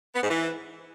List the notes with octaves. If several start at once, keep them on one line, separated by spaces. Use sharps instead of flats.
B3
G#2
E3